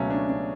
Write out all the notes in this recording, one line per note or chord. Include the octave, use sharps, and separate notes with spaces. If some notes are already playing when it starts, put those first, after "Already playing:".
Already playing: C#2 B2 F#3 A3 C#4
D4
D4